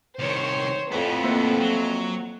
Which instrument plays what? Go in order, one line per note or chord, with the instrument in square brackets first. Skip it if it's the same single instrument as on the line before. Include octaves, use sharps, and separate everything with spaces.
[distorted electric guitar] C2 D#3 [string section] C5 C#5
[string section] F2 [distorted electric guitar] A2 B3
[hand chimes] A#3 C5
[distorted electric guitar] F#3